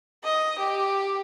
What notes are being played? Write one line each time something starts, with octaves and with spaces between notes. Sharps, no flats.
D#5
G4